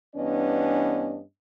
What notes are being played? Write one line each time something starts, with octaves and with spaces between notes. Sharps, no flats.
G2 E3 B3 C#4 D4 D#5